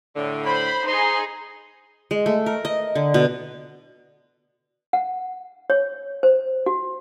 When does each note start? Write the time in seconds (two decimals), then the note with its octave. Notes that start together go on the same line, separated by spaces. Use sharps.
0.16 A2 D3
0.46 C5 B5
0.87 D#4 G#4 C5 C6
2.11 G#3
2.26 A3
2.46 A#4
2.65 D#5
2.95 D3
3.14 B2
4.93 F#5
5.70 C#5
6.23 C5
6.66 F#4